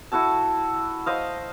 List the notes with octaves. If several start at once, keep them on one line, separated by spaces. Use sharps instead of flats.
E4 F#4 A4 A5
C5 D#5 F5